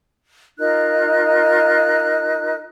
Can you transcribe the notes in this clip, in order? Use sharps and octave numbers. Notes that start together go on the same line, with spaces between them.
D#4 F4 A#4 F#6